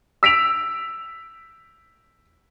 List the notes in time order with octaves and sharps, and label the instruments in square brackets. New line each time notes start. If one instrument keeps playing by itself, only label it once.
[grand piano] E6 B6 D7 F7